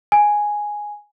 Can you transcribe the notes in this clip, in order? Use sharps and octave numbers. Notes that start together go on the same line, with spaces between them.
G#5